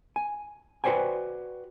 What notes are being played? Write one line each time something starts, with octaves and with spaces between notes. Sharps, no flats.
G#5
F#4 B4 C5 D5 G5 G#5